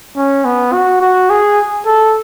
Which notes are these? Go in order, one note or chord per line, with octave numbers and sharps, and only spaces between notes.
C#4
B3
F#4
F#4
G#4
A4